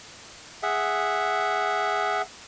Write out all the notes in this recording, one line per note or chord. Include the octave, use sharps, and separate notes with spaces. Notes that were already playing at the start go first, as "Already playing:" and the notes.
G#4 E5 F#5